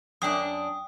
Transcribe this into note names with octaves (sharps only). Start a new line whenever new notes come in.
F#2 D4 G5 D#6